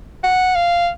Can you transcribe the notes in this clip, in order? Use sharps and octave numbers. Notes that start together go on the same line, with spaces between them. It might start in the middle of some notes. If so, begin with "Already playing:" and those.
F#5
F5